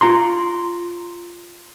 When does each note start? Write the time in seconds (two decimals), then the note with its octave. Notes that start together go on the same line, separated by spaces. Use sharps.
0.01 F4 A#5 C6